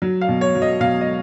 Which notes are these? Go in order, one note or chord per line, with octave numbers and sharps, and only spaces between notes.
F#3
F5
B2
C#5
F#3
D#5
B2 F5
D#5